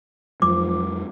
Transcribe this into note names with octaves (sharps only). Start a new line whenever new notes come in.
F2 F3 F#3 G#3 D6